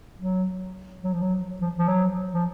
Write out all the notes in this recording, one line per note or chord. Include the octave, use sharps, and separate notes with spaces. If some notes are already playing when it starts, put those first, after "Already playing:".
F#3
F#3
F3
F#3
F3
F3
F#3
F3